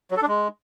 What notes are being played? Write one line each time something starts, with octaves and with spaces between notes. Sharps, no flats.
F#3
A4
D4
G#3